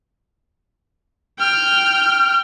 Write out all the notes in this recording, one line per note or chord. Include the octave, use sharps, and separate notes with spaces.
G5 F6